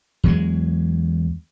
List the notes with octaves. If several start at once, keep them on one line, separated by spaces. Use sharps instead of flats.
E2 F#3 G#3